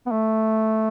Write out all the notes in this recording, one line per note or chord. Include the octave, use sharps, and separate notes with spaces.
B3
A3